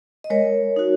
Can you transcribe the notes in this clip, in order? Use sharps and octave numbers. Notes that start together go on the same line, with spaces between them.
D#5
G#3 A#4 C#5
D#4 F#4